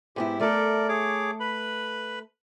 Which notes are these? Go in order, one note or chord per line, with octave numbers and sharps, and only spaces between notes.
G#2 B3 E4 G4
A3 A4 A#4 D5
G#4 C#5 D6
B4 B5